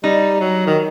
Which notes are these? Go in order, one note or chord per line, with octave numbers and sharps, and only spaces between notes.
G3 D#4
F#3
D#3